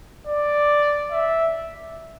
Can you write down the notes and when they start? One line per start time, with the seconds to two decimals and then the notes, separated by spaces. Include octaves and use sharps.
0.27 D5
1.11 E5